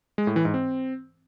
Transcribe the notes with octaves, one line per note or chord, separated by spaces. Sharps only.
G#3
A2
E3
G#2
C4